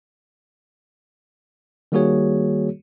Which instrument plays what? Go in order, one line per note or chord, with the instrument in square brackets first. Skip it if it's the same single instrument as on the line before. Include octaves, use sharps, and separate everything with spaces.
[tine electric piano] D#3 G3 A#3 F#4 G#4 C#5